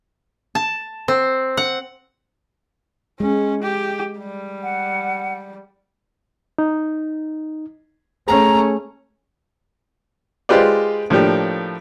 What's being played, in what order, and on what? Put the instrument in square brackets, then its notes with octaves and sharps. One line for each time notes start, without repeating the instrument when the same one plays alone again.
[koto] A5
C4
F#5
[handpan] G#3 [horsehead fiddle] C#4
[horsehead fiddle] G4
G3
[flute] F#5
[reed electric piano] D#4
[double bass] A3 C#4 [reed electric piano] G#4 [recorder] A#5
[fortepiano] G#3 F4 G4 B4 C5 D5
A2 F3 A#3 D4 G4